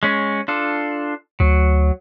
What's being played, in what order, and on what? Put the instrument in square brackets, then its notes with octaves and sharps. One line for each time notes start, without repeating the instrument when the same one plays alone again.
[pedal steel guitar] G#3 C#4
D4 F4 A4
[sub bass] D2 [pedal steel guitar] F#3